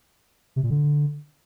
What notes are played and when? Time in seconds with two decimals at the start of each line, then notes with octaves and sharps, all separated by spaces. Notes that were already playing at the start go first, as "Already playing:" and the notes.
0.56 C3
0.63 A#2
0.70 D3